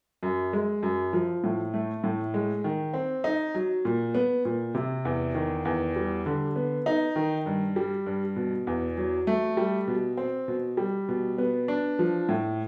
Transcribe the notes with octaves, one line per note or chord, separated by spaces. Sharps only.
F#2
G#3
F#2
F3
A2
A3
A2
G#3
D#3
C4
D#4
F#3
A#2
B3
A#2
C3
E2
D#3
E2
G3
D3
B3
D#4
D#3
G2
G3
G2
B2
E2
F#3
A3
G3
B2
C4
B2
G3
B2
B3
D4
F3
A2